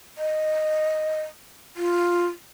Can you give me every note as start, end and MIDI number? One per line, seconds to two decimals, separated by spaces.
0.18 1.22 75
1.76 2.27 65